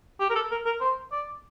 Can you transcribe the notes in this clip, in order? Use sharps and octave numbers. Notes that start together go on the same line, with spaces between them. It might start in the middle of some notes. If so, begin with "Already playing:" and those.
G4
A#4
A4
A#4
A#4
C5
D5